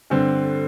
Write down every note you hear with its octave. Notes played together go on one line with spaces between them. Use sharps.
G2 D3 C4